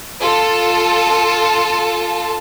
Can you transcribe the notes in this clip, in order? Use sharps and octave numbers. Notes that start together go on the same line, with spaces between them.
F4 A4 A5